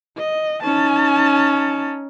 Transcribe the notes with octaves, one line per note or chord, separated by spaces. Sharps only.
D#5
C#4 D#4 A5